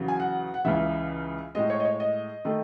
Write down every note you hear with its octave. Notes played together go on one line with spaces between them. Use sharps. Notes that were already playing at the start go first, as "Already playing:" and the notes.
Already playing: E2 C#3 F#3
G#5
F#5
F#5
C#2 C#3 E3 E5
A2 G#3 D#5
C#5
D#5
C#5
D#5
D#3 A3